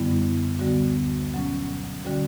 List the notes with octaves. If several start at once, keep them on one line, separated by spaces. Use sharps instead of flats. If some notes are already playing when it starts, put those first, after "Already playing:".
Already playing: F#2 D3 G3 B3 E4
D2 D3 G3 B3 F#4
B2 F#3 C#4
D3 G3 C#4 F#4